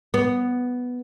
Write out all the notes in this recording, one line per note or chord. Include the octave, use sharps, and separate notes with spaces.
B3